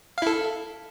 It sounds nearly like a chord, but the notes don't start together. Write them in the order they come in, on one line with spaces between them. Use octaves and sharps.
F5 E4 A4